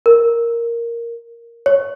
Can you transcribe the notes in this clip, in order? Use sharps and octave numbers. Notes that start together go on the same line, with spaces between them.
A#4
C#5